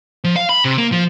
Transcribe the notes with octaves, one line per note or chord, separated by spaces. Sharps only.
F3
F5
B5
C3
A#3
F3